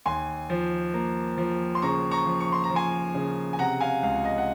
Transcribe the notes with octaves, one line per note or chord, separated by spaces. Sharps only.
D#2 G#5 C6
F3
A#3
F3
C6
C#3 A#5 C#6
A#5 C#6
F3
C#6
C6
A#5
F3
G#5 C6
C#3
G#5
C3 F#5 A#5
F5 G#5
C#2 F5
D#5
F#5